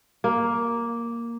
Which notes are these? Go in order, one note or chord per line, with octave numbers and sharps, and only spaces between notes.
A#3